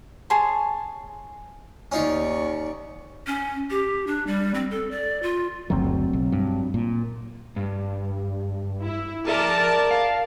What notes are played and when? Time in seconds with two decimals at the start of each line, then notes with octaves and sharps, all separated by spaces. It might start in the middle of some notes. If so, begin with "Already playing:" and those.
0.30 G#4 C#5 A5 C6
1.92 D#2 C#4 D#4 F4 D5 C#6
3.27 C#4
3.70 G4
4.07 D4
4.27 G3
4.55 C4
4.71 A4
4.91 D5
5.23 F4
5.70 F#1 D2 F#3 C4
6.13 B1
6.32 G2
6.74 A#2
7.56 G2
8.83 E4
9.28 G#4 A#4 D5 E5 A5
9.91 F5